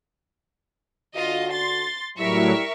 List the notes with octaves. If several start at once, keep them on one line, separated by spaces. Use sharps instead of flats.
D3 F4 F#4 D#5
C6 A6
A2 F#3 G3 E4 A#4 E5 C#6